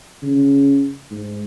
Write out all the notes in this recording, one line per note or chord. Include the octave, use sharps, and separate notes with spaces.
C#3
G#2